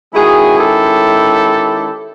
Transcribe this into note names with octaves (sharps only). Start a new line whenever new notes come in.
D#3 G#3 C#4 E4 F#4 G#4
G4 A4